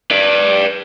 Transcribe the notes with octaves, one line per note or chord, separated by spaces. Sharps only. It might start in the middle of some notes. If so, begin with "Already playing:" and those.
B4 D5